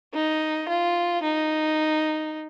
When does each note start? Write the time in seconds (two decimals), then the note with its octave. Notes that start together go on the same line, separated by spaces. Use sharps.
0.14 D#4
0.69 F4
1.23 D#4